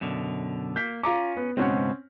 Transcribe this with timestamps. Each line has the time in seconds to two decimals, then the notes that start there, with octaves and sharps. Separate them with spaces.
0.01 F#2 B2 D3
0.76 A#3 G6 B6
1.03 C#4 F4 A#5 D6
1.37 B3
1.57 C#2 G#2 B2 C4 C#4 F#5